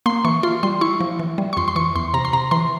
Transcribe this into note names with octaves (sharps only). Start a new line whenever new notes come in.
A#3 C6
E3 C#6
F4 C6
G3 C6
E4 C#6
F3
E3
G3
C#6
F2 C6
C6
E3 C#6
E2 C6
C3 A#5
C6
C3 A#5
E3 C6